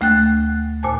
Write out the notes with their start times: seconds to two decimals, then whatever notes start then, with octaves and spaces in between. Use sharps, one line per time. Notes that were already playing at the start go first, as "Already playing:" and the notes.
0.01 D2 A3 G5 F#6 A6
0.83 D#2 A#2 C5 G#5 A5